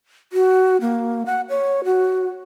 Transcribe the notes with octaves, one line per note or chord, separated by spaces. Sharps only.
F#4
A#3
F#5
C#5
F#4